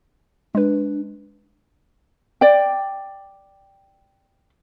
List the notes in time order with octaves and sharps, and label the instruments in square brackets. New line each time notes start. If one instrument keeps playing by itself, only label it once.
[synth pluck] G#3 B4 [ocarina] D4
[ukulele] D5 G5